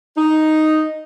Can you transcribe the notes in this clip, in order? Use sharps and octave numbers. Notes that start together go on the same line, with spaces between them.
D#4